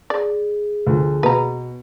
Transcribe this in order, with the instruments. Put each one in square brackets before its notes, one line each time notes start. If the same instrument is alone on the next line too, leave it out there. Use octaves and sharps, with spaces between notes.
[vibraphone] G#4 [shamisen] D5
[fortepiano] D2 F3
[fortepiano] B2 [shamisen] B4 A#5